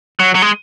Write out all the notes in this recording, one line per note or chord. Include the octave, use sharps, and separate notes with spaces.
F#3
F#3
G#3